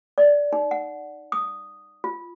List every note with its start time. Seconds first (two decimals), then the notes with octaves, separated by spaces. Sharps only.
0.18 D5
0.53 D#4
0.71 F#5
1.32 D#6
2.04 F4